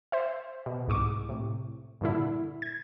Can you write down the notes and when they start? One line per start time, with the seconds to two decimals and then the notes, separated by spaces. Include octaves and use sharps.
0.12 C5 E5
0.66 B2
0.88 C2 G#2 C#6 D6
1.29 A2 C3
2.01 G2 A#2 D3 E4
2.62 G#6